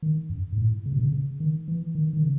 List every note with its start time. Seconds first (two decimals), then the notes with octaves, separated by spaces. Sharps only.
0.02 D#3
0.30 F#2
0.52 G#2
0.58 A2
0.86 C#3
0.93 B2
1.00 C#3
1.12 C#3
1.40 D#3
1.68 E3
1.95 D#3
2.13 D#3
2.23 C#3